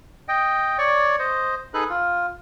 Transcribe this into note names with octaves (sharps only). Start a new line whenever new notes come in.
D#5 G5
C#5 D5 C#6
C5 D#5
D#4 G#4 A4 B4 F#6
F4